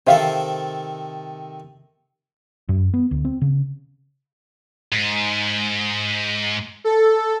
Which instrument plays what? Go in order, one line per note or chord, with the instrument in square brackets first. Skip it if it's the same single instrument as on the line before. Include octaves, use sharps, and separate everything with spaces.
[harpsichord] C3 D#3 A4 [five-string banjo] C5 E5 F5
[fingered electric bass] F#2
B3
D2
C4
C#3
[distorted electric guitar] G#2
[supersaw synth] A4